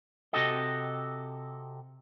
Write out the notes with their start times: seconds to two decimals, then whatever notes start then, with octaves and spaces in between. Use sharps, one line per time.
0.33 C3 C4 F#4 G4 A4 D#5